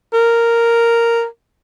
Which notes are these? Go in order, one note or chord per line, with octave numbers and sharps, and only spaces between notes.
A#4